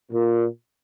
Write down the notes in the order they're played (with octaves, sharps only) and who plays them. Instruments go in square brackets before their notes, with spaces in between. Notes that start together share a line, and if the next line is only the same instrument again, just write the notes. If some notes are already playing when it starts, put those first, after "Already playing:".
[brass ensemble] A#2